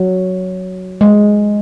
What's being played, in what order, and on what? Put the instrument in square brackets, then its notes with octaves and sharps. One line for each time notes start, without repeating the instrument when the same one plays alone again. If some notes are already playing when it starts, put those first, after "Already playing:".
Already playing: [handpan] F#3
G#3